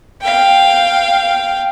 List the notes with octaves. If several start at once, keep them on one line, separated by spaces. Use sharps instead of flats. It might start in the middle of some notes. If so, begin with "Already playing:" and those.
F5 G5